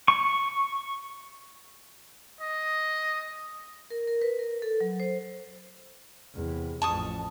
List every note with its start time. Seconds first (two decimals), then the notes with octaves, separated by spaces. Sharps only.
0.08 C#6
2.41 D#5
3.90 A#4
4.08 A#4
4.22 B4
4.39 A#4
4.62 A4
4.80 F#3
5.00 C5
6.34 E2 C3
6.82 A1 F2 A5 C#6 D#6